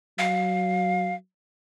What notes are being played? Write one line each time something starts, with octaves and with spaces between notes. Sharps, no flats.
F#3 F5